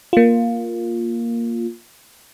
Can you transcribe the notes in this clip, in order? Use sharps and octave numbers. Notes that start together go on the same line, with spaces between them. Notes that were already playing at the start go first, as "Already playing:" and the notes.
A#3 F4